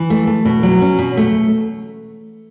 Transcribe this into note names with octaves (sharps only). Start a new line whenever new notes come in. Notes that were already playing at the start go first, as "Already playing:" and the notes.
Already playing: E3
A3
A3
B2
F#3
C#4
B2
A3